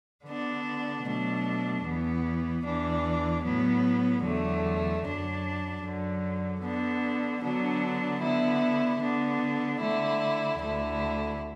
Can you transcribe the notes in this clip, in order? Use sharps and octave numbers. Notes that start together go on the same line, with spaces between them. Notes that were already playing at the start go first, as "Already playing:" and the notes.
D3 B3 D4
B2 F#3 A3 D4
E2 E3 B3
E2 E3 D4
A2 F#3 B3
E2 D3 F#3 A3
F#2 F#3 D4
F#2 D3 F#3
D3 B3 D4
D3 F#3 B3 D4
D3 B3 E4
D3 B3 D4
D3 A3 E4
D2 D3 A3 E4